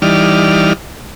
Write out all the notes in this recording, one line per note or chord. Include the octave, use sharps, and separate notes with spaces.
E3 G3 D#4 D5 F6